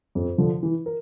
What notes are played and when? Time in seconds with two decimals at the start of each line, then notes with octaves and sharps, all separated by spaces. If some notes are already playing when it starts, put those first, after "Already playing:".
0.15 F2
0.38 D3 F3
0.63 E3
0.86 A#4